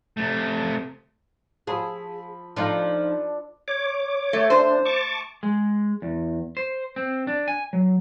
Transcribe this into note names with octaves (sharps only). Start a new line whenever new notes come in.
C3 A3
F3 G#4 B5 E6
F3 D4 D#4 F4 A4
C#5 D6
A3
D4 C5
A5 C#6 D6
G#3
E2
C5
C4
D4
G#5
F#3